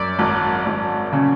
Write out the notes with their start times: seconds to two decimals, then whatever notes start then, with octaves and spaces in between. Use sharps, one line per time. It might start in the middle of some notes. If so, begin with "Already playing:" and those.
Already playing: F#2 D5
0.19 G#1
0.66 G#1
1.12 C#3